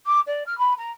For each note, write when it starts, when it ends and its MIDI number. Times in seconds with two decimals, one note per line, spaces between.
0.06 0.20 86
0.27 0.43 74
0.46 0.57 89
0.58 0.74 83
0.78 0.91 82